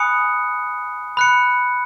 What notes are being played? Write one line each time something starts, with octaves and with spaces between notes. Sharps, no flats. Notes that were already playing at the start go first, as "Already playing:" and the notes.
Already playing: G#5 B5 D#6 F#6 C#7
B5 F#6 C#7